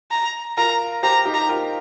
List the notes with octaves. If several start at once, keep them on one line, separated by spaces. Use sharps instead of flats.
A#5
F4 A#4 A#5
G4 C5 A#5
D#4 G4
A#5
F4 A#4